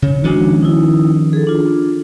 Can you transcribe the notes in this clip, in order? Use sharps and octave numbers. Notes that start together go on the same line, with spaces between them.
C#3 C#5
D#3 F3 G#3 C#4 D4 F#4
D#4 E4
G#4 A4
D4 F4